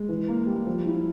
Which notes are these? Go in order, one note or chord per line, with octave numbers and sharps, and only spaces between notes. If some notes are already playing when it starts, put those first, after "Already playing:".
Already playing: G#3
E3
A#3
G3
F3
E4